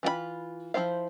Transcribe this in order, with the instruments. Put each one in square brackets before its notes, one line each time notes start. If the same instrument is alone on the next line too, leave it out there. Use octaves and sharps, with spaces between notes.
[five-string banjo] E3 F4 F#4 B5
F3 C#4 E4 C5 F5